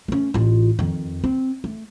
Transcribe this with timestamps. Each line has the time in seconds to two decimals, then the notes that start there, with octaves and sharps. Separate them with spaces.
0.08 A3 C#4
0.34 A1 F4
0.79 F2 D#3
1.24 C4
1.64 A3